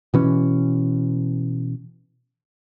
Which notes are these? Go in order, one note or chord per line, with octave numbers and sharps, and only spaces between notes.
B2 E3 C#4